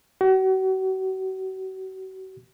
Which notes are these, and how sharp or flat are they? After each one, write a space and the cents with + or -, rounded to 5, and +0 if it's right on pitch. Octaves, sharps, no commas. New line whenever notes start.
F#4 +40